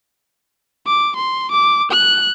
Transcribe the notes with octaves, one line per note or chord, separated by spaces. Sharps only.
D6
C6
D6
F#6